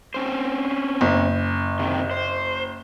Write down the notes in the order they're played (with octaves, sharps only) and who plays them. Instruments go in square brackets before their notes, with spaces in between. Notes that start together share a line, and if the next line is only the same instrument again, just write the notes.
[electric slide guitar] C4 C#4 C5
[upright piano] F#1
[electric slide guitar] C3 D#3
C5